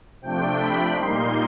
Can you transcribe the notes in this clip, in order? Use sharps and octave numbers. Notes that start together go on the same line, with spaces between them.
C3 F3 A3 D4 G5
B5
A#2 G3 A#3 D#4 C6